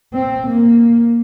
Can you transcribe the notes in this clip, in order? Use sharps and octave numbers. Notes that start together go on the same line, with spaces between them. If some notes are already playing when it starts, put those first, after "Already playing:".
C4
A#3